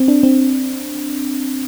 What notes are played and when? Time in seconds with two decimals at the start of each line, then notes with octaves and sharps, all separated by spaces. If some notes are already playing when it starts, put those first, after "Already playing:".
Already playing: C4
0.08 D4
0.23 C4